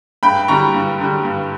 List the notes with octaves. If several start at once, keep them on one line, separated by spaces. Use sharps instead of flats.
G2 G5 B5
D3 G3 A#5 C#6
G2
D3 G3
G2